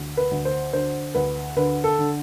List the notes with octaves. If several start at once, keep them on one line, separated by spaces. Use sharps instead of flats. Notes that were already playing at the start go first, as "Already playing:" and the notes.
Already playing: D2
B4
D2
C5
D3 C5
D2 B4
D3 B4
A4
D3